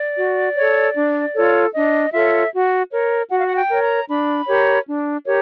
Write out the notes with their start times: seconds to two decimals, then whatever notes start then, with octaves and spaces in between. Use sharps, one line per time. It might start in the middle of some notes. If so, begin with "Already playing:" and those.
Already playing: D5
0.17 F#4
0.56 A4 C#5
0.96 D4
1.35 F4 A4 C#5
1.74 D4 D#5
2.13 F4 A4 C#5 E5
2.52 F#4
2.91 A#4 C#5
3.30 F#4 F#5
3.39 F5
3.47 F#5
3.56 G5
3.69 A#4 C#5
3.83 A#5
4.09 D4 B5
4.47 G4 A#4 C#5
4.87 D4
5.26 G4 A#4 C#5